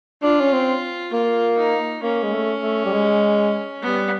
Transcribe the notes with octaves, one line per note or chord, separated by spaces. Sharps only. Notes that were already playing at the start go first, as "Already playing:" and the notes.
D4 F4
C#4
C4
A#3 F4
D#4
A#3 C#4
G#3
A3
A3
G3
G#3
G3 B3